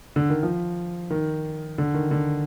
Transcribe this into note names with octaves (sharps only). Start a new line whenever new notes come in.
D3
D#3
F3
D#3
D3
D#3
D3